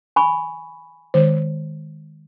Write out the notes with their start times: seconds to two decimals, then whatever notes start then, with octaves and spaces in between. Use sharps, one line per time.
0.16 G#5 B5 C#6
1.14 D#3 G#3 C5